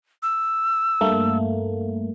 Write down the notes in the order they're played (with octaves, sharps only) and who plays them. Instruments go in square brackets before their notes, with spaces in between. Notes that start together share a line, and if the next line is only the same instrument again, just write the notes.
[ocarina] E6
[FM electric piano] G2 A3 A#3